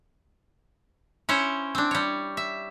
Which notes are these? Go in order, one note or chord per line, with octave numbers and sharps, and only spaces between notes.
C#4 E4 C5 C#5
C4 D4
G3 C#5
E5